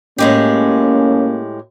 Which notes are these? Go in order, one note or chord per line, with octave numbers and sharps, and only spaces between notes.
A2 G#3 A#3 C#4 G4